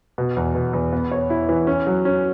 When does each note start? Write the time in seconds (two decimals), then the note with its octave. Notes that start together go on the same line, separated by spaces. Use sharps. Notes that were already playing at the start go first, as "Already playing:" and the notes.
0.18 B2
0.37 E2
0.55 B2
0.73 E2
0.93 B3
1.12 C#5
1.30 E4
1.49 E3
1.67 C#4
1.87 F#3
2.05 C#4